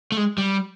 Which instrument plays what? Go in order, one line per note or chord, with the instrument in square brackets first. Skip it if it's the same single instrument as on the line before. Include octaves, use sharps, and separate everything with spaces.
[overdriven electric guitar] A3
G#3
G3